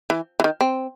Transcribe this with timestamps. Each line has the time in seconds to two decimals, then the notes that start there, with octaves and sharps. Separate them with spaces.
0.10 E3
0.40 E3
0.44 D#3
0.61 C4